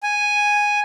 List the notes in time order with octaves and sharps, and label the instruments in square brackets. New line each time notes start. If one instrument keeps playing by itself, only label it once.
[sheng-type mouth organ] G#5